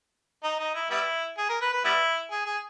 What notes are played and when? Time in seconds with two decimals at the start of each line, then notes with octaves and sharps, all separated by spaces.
0.44 D#4
0.59 D#4
0.75 E4
0.91 G3 B3 E4
1.38 G#4
1.49 A#4
1.61 B4
1.73 B4
1.84 G3 B3 E4
2.31 G#4
2.46 G#4